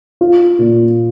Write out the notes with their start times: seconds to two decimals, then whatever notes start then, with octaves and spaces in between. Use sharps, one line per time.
0.21 F4
0.59 A#2